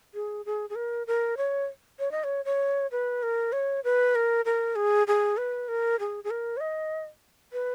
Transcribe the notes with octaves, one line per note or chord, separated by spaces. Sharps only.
G#4
G#4
G#4
A#4
A#4
C#5
C#5
D#5
C#5
C#5
B4
A#4
C#5
B4
A#4
A#4
G#4
G#4
B4
A#4
G#4
G#4
A#4
C#5
D#5
B4